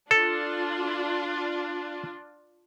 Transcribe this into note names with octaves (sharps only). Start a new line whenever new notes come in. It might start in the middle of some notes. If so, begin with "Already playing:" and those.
D4 F4 A4